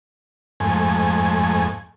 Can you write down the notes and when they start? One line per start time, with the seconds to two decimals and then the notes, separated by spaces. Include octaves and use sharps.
0.60 F2 G#2 A3 G#5